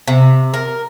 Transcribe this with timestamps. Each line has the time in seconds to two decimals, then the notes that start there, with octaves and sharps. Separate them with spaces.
0.07 C3
0.54 A#4